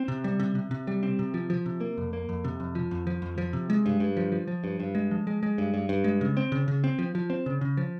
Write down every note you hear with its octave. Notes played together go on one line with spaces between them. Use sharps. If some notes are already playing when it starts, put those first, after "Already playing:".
Already playing: C4
C3
G3
C3
C3
C3
G3
C4
C3
F3
F3
C3
A#3
F2
A#3
F2
C3
F2
F3
F2
F3
F2
F3
C3
G#3
G2
G2
F3
F3
F3
G2
G2
G#3
F3
G#3
G#3
G2
G2
G2
G#3
C#3
C4
C#3
C#3
C4
F3
F3
C4
C#3
C#3
F3